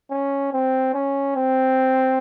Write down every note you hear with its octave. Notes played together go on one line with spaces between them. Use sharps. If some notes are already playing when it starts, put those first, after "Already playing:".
C#4
C4
C#4
C4